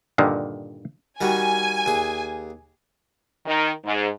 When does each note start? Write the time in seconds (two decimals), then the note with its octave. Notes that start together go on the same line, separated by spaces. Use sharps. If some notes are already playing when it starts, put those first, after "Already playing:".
0.18 G2 A#2 D3 D#3
1.21 D#3 G3 F#4 G#5
1.86 D#2 G#4
3.46 D#3
3.85 G#2